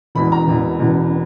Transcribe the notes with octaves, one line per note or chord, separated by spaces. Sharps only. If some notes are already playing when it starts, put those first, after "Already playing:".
E1 E2 B2 B5
A#5
E1 E2 B2
E1 E2 B2